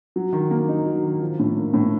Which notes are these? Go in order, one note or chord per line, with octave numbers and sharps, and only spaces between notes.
F#3
D#3
A#3
D#4
F#3
D#3
F3
A2
A#3
A2